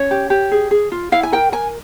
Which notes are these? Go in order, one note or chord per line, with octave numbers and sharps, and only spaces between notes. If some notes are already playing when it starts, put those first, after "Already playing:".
Already playing: C#4 C#5
G4
G4
G#4
G#4
F4
E4 F5
G#5
A#4 G5
A#4 G#5